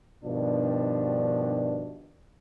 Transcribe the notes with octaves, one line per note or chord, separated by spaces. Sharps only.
G2 B2 D#3 F3 D4